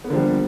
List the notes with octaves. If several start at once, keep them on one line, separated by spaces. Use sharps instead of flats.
D3 F3 G3 A#3 B3